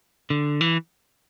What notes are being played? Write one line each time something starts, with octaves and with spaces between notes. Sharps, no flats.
D3
E3